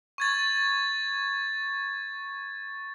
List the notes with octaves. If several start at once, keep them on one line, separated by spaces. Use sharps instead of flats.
C#6 G#6 A6